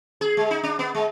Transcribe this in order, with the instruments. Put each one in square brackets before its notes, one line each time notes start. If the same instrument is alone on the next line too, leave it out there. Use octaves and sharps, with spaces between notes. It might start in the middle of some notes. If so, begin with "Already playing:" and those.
[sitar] G#4
G#3
D#4
D4
B3
G#3